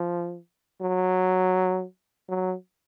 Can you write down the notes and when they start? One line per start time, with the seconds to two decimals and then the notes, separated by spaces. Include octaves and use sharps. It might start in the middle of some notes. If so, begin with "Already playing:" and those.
Already playing: F3
0.82 F#3
2.29 F#3